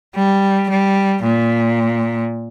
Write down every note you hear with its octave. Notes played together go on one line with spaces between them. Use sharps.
G3
G3
A#2